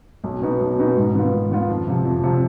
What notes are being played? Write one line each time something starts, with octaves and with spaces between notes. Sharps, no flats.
B1
B2 B3 D#4
B1
B2 B3 D#4
G#2
D#3 B3 F4
G#2
D#3 B3 F4
F2
C3 F3
F2
C3 F3